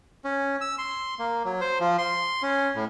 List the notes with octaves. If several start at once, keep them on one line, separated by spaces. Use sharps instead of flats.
C#4
E6
C6
A#3
F#3
C5
F3
C6
C#4
A2